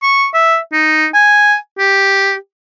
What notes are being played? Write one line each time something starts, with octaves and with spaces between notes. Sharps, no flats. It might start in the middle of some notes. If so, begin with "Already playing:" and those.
C#6
E5
D#4
G#5
G4